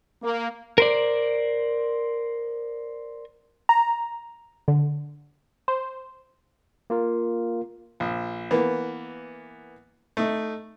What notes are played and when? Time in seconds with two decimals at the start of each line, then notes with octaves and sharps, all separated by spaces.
0.23 A#3
0.78 A#4 C5 D5
3.69 A#5
4.68 D3
5.68 C5
6.90 A#3 F4 A#4
8.00 A#1
8.51 E3 A#3 B3
10.17 A3 D#4